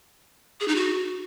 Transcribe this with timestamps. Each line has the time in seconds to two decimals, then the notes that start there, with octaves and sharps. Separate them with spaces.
0.60 G#4
0.68 D#4
0.76 F#4